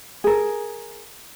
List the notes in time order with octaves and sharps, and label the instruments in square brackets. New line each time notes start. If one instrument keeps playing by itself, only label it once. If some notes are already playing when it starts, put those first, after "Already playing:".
[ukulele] G#4 A#4